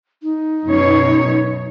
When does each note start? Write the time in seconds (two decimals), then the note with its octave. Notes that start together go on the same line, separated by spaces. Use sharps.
0.22 D#4
0.65 F#2 B2 C#5